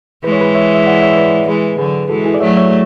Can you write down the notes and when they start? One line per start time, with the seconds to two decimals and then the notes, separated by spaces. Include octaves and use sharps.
0.24 E3 G#3 B4
0.32 C#5
0.41 G#4 B4
0.55 C#5 E5
0.75 E5
0.87 D5 F#5
1.02 C#5 E5
1.12 E5
1.17 B4 D5
1.48 E3 G#3 G#4 B4
1.78 D3 F#3 G#4 B4
2.10 E3 G#3 F#4 A4
2.26 E4 G#4
2.34 D5
2.40 F#3 A3 C#5 E5
2.57 C#5 E5